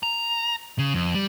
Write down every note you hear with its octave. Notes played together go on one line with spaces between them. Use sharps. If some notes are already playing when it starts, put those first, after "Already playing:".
A#5
C#3
F2
G3